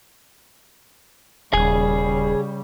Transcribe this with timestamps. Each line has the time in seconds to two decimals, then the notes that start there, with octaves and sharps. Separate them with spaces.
1.53 D#1 C#3 G3 G#4 G#5